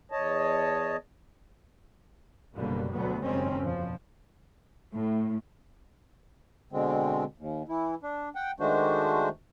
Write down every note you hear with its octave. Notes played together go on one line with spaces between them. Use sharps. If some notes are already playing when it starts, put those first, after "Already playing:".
E2 C#5 D#5 A5
F#1 B2 D3 G3 A#3
D2 B2 F#3 G3 B3
F#1 G#2 D#3 G3 C4 C#4
E2 B2 F3
A2
B2 D3 G#3 C4
D#2
E3 E4
D4
F#5 G5
D#3 G#3 A3 D4 F#4 C5